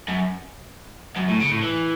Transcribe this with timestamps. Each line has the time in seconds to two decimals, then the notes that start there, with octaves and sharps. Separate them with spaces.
0.08 F#2
1.16 F#2
1.28 A2
1.40 C#3
1.51 A2
1.63 E3